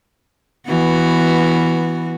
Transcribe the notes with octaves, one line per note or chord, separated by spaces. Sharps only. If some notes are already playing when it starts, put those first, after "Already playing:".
E3 B3 F#4